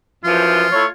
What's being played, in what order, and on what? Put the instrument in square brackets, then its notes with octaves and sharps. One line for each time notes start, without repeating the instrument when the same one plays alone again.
[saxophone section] F#2 E3 F3 [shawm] F4
[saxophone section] A3 E4 C#5